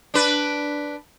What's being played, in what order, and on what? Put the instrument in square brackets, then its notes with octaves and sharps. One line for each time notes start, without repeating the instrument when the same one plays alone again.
[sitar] D4 B4